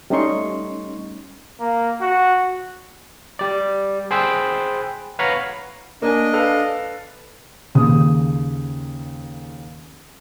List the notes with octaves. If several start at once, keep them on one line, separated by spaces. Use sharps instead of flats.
G3 A3 C#4 D#4 C6 C#6
A#3
F#4
G3 D5
G#4 C5 G5 B5 E6 F#6
B4 C#5 F5 F#5 A#5 B5
A#3 D4 D#5 G#5
A4 B4 F5
D#2 C#3 D#6